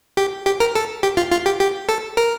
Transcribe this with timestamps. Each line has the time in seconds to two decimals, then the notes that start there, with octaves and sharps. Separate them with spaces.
0.17 G4
0.46 G4
0.60 A#4
0.75 A4
1.03 G4
1.17 F4
1.32 F4
1.46 G4
1.60 G4
1.89 A4
2.17 A#4